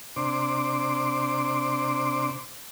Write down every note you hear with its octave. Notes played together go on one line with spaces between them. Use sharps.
C3 D4 C5 D6